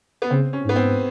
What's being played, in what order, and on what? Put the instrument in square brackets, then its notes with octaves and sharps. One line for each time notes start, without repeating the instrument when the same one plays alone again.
[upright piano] B3
[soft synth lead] C#3 [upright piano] C4
[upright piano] C#4
[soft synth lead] G#2 [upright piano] B3
[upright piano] C4